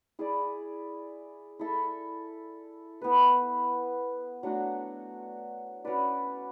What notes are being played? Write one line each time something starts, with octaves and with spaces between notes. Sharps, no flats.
E4 G#4 D5
E4 A4 E5
B3 E4 B4
F#3 A3 D4 F#4
C#4 F#4 B4 D5